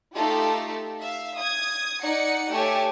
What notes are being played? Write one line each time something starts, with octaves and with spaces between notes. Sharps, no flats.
A3 D#4 F4 G4 A4
E5 F5
D#6 G#6
D#4 D5 F#5 C#7
A3 G4 C#5 G#5 A5